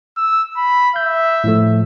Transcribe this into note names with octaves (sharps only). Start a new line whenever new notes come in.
E6
B5
E5 G6
A2 F3 A3